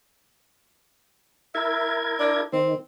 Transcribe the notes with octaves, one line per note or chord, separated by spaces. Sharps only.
E4 A#4 E5 G#6
D4
D#3 C4